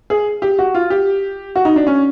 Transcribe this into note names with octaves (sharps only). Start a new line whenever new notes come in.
G#4
G4
F#4
F4
G4
F#4
D#4
D4
C#4